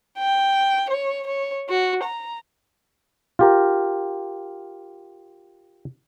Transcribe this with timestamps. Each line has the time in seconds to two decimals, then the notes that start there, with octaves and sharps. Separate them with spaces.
0.19 G5
0.90 C#5
1.27 C#5
1.69 F#4
2.03 A#5
3.39 F4 G4 A#4